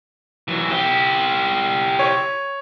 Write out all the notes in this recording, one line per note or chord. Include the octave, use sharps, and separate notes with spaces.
E3 F#3
E4 G4
C#5